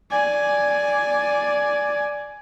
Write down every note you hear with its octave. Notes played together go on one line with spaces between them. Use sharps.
D5 G#5